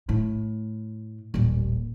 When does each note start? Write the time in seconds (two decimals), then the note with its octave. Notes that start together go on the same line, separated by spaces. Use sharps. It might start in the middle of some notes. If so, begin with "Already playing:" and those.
0.09 A2
1.34 D#1 A1